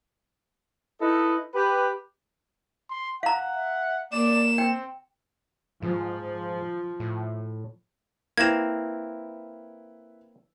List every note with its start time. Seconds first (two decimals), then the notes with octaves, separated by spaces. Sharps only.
1.02 D#4 E4 A4 B4 D#5
1.55 G4 B4
2.90 C6
3.23 F5 F#5 A#5
3.55 E5
4.12 A#3 D5 E7
4.58 C4 G5
5.83 G#2 F3
7.00 A2
8.38 A#3 C4 E4 B4 G#6 E7